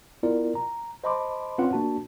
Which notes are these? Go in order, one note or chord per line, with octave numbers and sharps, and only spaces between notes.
B3 E4 F4 A#4 D5
A#5
C5 D#5 A5 B5 C6 D6
C4 C#4 F4 B4 C#5 F#5
A#3 D4 F#4 A5